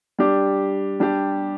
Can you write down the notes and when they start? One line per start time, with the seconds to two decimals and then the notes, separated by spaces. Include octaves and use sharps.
0.19 G3 D4 G4
1.00 G3 D4 G4